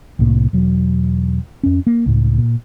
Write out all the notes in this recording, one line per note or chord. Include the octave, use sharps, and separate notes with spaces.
C2 A2 A#3
E1 F#3
F2 C#4
A#3
C#2 A2
A#2